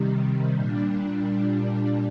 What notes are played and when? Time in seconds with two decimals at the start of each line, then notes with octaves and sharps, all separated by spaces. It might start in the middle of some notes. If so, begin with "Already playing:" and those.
Already playing: C3 D#3 G3
0.54 A#2 G3 D4